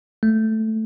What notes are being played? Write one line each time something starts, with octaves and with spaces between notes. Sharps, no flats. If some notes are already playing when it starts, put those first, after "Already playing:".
A3